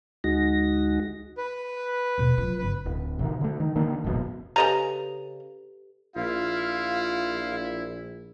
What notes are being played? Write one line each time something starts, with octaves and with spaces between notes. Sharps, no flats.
D2 G#3 D#4 F#4 A#6
B4
E2 B2
F#3 F4
G1 C#2 B4
D1
A1 C3 D#3
D3 A3
D#3
D3 D#3 A#3 D4
E1 A1 F#2 B2
C#3 G4 A4 B4 D#5 A#5
A#1 E4 F4 F5